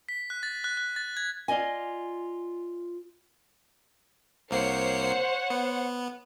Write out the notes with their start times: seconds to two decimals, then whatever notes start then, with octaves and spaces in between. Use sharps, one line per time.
0.09 B6
0.30 F#6
0.43 A6
0.64 F#6
0.77 F#6
0.96 A6
1.17 G#6
1.48 F4 D5 D#5 G#5
4.51 C2 A#3 C5 C#5 F#5 C7
5.50 B3